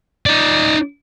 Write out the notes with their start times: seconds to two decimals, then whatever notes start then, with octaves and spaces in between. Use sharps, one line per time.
0.26 D#4 D5